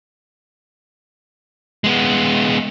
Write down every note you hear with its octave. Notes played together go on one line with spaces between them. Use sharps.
G#3 B3